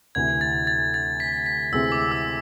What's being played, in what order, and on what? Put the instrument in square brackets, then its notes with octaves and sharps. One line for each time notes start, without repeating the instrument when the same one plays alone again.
[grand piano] D2 C3 E3 [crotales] G#6
[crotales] A6
A6
A6
B6
B6
[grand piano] D2 C3 E3 G#3 C4 [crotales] E6
[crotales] D6
E6